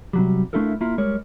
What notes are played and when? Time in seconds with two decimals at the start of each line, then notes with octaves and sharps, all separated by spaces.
0.13 C3 F#3 G3
0.53 A3 D4 E4 F4 A4 A#4
0.81 A#3 E4 F4
0.98 G3 G#3 A#4 C#5